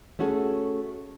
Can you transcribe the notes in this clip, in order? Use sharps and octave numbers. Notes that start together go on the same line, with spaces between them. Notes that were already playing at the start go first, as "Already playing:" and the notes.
A3 C#4 F#4 G#4 A4